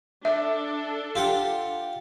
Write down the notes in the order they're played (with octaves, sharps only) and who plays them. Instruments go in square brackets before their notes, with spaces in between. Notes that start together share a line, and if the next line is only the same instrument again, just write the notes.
[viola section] D4 A4 [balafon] E5
[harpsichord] F4 G4 F#5